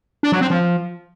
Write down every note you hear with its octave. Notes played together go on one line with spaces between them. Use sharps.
D4
F#3
C4
F3